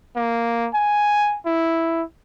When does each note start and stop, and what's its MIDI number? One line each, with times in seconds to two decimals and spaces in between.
0.16 0.69 58
0.74 1.38 80
1.46 2.03 64